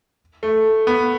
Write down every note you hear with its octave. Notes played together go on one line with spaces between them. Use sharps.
A3
B3